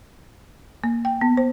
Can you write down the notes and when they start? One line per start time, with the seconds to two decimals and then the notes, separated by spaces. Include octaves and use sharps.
0.84 A#3
1.05 G5
1.21 B3
1.37 C5